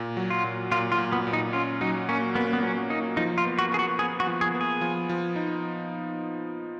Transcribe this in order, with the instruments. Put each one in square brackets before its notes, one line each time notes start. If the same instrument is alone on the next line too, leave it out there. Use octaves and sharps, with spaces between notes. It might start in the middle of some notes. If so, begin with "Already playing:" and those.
Already playing: [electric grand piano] A#2
F#3
[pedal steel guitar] F4
[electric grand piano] A#2
[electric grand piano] A#2 [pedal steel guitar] F4
[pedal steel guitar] F4
[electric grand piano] A#2
[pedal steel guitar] B3
[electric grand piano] A#2
[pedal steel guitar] D#4
[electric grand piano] C#4 [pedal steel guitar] F4
[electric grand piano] F#3 [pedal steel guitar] D#4
[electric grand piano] A#3 [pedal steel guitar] C#4
[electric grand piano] A#3 [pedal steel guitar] B3
[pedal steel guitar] B3
[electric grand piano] F#3 [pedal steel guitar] C#4
[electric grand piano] A#3 [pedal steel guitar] D#4
[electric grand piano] F3 [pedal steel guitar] D#4
[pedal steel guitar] F4
[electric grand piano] B3
[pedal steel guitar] F#4
[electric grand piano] B3 [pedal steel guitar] G#4
[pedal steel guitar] F#4
[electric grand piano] B3 [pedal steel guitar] G#4
[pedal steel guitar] F#4
[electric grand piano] F3
[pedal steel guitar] G#4
[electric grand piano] B3
[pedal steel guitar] G#4
[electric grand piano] F3
F3
D#4